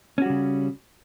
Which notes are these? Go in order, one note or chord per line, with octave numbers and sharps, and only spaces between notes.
C#3 G3 C#4 F#4